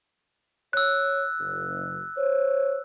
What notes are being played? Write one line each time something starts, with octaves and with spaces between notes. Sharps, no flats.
C#5 E6 F#6
F#1
C5 C#5